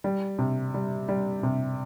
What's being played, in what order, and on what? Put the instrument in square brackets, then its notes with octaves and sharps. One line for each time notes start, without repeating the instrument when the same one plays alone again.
[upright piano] G3
C3
G3
G3
C3